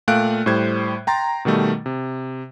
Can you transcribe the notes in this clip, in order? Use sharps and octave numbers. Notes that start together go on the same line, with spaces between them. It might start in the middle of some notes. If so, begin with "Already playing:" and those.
A#2 A3 F5 G5 F#6 D7
A2 G3 C5 G#6
G5 A#5 C6 A6
B2 D#3 G3 A3
C3